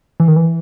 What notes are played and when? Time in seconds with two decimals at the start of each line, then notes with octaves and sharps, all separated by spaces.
0.20 E3
0.28 D#3
0.36 E3